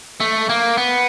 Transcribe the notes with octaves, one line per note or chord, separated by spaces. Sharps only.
A3
A#3
B3